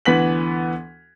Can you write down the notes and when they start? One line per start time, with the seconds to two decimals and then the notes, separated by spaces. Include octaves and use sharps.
0.05 D2 E3 B3 B6 F#7